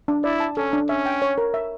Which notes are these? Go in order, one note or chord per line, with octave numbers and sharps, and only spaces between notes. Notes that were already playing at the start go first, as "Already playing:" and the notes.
D4
E4 D5
A5
C#4 A4
D4
C#4 E5
G5
C#5
A#4
E5